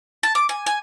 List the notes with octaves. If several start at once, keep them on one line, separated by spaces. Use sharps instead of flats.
A5
D6
G#5
G#5